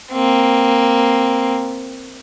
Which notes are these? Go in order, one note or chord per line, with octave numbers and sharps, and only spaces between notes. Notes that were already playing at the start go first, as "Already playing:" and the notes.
A#3 C4